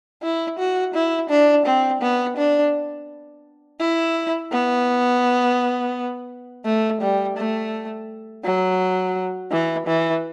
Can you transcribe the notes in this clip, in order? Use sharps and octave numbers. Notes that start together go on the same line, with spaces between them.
E4
F#4
E4
D4
C4
B3
D4
E4
B3
A3
G3
A3
F#3
E3
E3